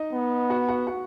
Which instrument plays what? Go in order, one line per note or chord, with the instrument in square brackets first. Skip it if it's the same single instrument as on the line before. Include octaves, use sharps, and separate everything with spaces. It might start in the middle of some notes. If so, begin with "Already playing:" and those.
Already playing: [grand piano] D#4 D#5
[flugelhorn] B3
[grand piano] F#4 F#5
F#4 F#5
F#4 F#5